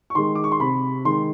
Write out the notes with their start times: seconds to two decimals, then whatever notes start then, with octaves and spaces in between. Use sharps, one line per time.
0.10 C#6
0.15 D#3 G#3 C6
0.35 D6
0.44 C#6
0.52 C6
0.60 C3 B5
1.05 D#3 G#3 C6